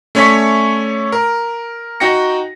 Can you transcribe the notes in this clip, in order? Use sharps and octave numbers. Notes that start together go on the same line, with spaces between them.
A3 C#4 C#5 D5 C#6 B6
A#4
D#4 F#4 G5 A#6 C#7